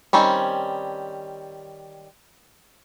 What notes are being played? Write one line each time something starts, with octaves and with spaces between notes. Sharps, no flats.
D#3 G3 C4 C#4